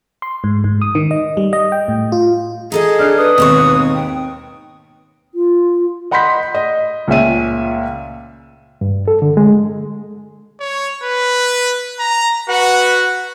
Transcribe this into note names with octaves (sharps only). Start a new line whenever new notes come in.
C6
G#2
G#2
D#6
D#3
D#5
G3
D#5
G5
A2
F4
D#4 G#4 A4 D#5
D4 F6 F#6 C7
B4 D#6
D#2 G#2 B2 C4 C#5 C#6
G5
F4
D#5 F#5 B5 C6 G6 B6
D#5
C#2 A#2 C#4 E5 D#7
G2
A4
D3
G#3
C#5
B4
A#5
F#4 B4 F#5